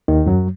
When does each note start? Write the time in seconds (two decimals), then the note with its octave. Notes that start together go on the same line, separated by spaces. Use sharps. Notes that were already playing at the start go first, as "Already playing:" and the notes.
0.08 D#2 D#3
0.26 F#2 F#3